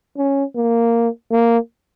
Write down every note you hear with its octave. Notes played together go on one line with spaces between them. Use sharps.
C#4
A#3
A#3